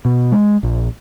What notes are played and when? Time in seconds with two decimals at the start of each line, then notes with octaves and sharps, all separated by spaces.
0.05 B2
0.32 G#3
0.63 A#1